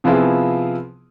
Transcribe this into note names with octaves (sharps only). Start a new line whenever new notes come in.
C3 F3 B3 E4 F4 G#4